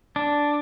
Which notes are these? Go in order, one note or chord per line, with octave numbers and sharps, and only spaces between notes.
D4